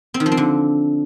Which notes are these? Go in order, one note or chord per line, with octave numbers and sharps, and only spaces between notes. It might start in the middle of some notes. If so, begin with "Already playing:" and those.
C4
D#3
F3
C4
D3